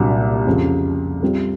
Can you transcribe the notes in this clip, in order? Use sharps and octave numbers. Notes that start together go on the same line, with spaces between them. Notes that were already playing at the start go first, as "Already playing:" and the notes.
Already playing: C2 A#2 F#3 A#3 D4
F2 C#3 F3
G3 C4 F4